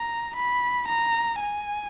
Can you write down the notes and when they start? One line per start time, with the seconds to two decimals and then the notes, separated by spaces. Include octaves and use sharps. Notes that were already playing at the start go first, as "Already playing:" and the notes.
Already playing: A#5
0.36 B5
0.88 A#5
1.40 G#5